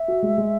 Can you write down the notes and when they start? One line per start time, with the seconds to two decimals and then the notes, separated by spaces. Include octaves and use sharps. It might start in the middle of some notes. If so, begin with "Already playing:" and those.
Already playing: E5
0.08 F#4
0.23 G#3
0.38 G#3